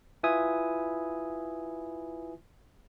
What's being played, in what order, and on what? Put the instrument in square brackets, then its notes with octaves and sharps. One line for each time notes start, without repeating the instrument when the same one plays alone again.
[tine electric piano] E4 F4 B4 E5 G#5 D#6